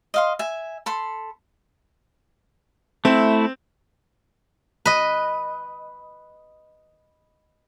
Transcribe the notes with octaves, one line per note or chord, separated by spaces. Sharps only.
D#5 F5 C6
E5 G#5
A4 B5 C6
A3 C4 E4
B4 D#5